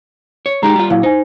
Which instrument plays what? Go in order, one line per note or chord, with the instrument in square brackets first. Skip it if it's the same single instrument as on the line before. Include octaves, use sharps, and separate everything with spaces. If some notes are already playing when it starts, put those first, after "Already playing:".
[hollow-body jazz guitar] C#5
[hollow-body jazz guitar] G#3 D#4 G4 [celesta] A#5
[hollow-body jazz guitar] G3 F4
[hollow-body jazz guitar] A#2 F#3 [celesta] E4 F5
[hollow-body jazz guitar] D#4 [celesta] C5 G#5